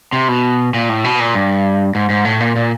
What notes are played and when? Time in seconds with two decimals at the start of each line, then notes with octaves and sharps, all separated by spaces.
0.13 C3
0.28 B2
0.74 A#2
0.89 A2
1.04 B2
1.20 A#2
1.34 G2
1.95 G#2
2.10 G#2
2.25 A2
2.41 A#2
2.56 A#2